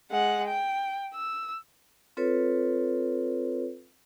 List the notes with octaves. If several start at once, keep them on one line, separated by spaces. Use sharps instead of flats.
G#3 F#5
G5
E6
C4 F4 A4 B4 C#5